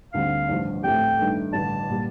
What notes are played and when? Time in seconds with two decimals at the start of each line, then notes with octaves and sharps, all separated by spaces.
0.13 D2 D3 G3 C4 F5
0.49 A1 G2 F3
0.83 A2 A3 C4 G4 G5
1.19 G2 D#3 A3
1.53 A1 G2 D3 A5
1.90 A#2 G3